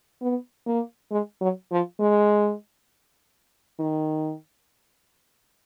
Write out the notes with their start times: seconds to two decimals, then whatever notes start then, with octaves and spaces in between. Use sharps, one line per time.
0.22 B3
0.66 A#3
1.11 G#3
1.41 F#3
1.71 F3
2.00 G#3
3.79 D#3